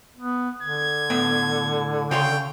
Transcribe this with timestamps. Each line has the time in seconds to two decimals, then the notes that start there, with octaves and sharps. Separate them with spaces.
0.17 B3
0.63 D3 G#6
1.10 A2 B3 G5
2.11 C#3 C#5 G5 C6